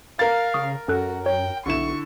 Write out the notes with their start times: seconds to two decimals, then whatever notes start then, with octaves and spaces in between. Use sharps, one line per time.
0.19 A#4 F5 A6
0.54 C#3 C#6 D#6
0.88 F#2 C#4 F#4 A4 F#6
1.26 C#5 G5
1.66 B1 D3 E4 C#6 E7